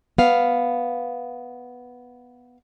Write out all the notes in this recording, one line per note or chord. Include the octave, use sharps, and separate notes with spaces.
B3 F5